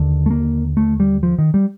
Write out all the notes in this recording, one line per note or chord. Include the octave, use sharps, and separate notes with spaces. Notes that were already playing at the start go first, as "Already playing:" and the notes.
Already playing: D#2 D3
A3
A#3
A3
G3
F3
D#3
G3